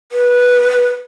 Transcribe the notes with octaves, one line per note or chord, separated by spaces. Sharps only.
B4